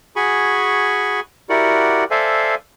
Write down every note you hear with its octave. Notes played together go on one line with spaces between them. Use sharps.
F#4 G#4 G#5 B5 C#6
E4 F#4 G4 A#4 D5 F#5
A4 C5 D5 E5 F5 G#5